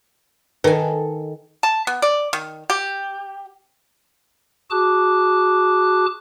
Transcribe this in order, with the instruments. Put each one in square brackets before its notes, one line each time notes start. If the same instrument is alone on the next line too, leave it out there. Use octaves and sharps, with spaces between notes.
[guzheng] D#3 G#5 [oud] A4 [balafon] B4
[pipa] A5
B3
D5
D#3
G4
[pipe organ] F#4 G#4 A5 D6 F#6